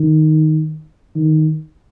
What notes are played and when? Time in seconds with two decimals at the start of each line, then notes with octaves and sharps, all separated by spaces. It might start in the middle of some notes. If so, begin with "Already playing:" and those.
Already playing: D#3
1.15 D#3